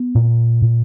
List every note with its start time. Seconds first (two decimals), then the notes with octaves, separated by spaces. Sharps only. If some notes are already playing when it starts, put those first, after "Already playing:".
Already playing: B3
0.15 A#2
0.62 A#2